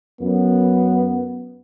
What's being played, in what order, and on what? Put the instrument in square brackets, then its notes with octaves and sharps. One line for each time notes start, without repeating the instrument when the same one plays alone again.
[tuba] F#2 [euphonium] B3